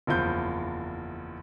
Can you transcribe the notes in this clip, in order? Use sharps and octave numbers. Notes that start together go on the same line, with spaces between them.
F#1 E2 F3 F4 G6